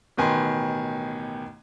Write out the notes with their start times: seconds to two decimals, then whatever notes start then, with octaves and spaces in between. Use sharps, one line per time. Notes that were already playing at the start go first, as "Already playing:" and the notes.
0.17 A1 B2 D#3 B4 G#5 C6